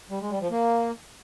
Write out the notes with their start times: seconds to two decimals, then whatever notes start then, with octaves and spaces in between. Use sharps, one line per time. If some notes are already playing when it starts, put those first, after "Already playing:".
0.10 G3
0.21 G#3
0.31 G3
0.41 F3
0.51 A#3